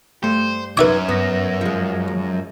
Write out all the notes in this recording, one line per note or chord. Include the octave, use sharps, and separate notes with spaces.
G2 A3 C5
F#2 D#4 B4 E5 D6 G#6
G2 B3 A#6
F3 G#3